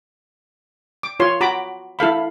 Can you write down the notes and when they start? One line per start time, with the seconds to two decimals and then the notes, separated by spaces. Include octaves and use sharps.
1.03 D6
1.20 F4 C#5 C6
1.41 F#4 A#5 B5 D6
1.99 E4 A4 F5 B5